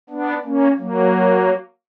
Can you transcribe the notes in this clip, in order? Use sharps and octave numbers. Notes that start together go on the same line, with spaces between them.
B3 D4
A#3 C#4
F#3 A#3